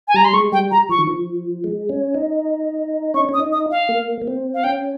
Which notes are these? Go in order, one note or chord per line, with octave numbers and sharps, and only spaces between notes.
G#5
G3 A#5
C6
G#3 C#6
G3 G5
A#5
F3 C#6
D#3
F3
G#3
C#4
D#4
C#4 C#6
C#4 D#6
D#4
D#6
F5
A#3
A#3
C4
F5
C#4 G5